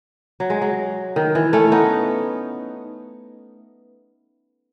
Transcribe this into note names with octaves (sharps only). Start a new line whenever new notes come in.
F#3
G#3
F#3
D#3
E3
A3 C#4
B3 D#4